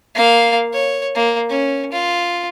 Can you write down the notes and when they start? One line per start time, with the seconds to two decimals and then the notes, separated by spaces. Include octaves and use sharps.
0.15 A#3 F5
0.74 C#5
1.15 A#3
1.50 C#4
1.93 F4